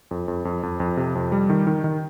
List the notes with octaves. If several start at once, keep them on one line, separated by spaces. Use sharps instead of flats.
F2
F2
F2
F2
F2
C3
F2
G3
D#3
D#3
D#3